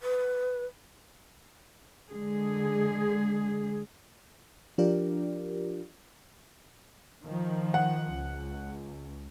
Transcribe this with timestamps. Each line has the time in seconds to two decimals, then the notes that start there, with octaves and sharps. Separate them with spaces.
0.01 B4
2.10 D3 G#3 G#4
4.78 F3 D4 F4 G4 A#4 D5
7.26 D#3 F3
7.74 F#5
8.13 C#2